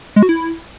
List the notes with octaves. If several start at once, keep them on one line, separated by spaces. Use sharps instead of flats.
G#3
F#4
E4